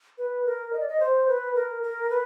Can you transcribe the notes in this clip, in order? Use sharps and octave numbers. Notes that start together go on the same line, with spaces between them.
B4
A#4
D#5
D5
D#5
C5
B4
A#4
A#4
B4